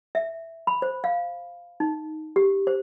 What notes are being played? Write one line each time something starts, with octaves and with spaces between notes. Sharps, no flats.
E5
B5
C5
F5
D#4
G4
C5